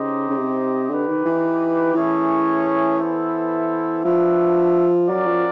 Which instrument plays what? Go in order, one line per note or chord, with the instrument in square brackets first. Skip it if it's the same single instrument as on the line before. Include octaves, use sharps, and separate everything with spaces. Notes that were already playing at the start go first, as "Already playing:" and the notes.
Already playing: [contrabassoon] C#3 [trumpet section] D#4 G4 C5 D#5
[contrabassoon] C#3
C3
[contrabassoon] D3 [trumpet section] D#4 G4 B4
[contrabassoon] D#3
E3
[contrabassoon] E3 [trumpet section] A3 C#4 E4 G#4 C#5
[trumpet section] B3 E4 A4 C5 E5
[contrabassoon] F3 [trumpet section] D4 F#4 B4 E5
[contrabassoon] F#3 [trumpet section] C#4 F#4 A#4 D5
[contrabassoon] F3